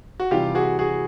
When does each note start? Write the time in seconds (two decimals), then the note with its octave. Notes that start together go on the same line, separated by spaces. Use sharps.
0.20 F#4
0.31 C3 E3 G3 F4 G4
0.55 F#4 G#4
0.79 F#4 G#4